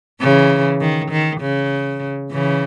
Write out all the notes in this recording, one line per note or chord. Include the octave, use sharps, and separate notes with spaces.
C#3 E3
D#3
D#3
C#3
C#3 E3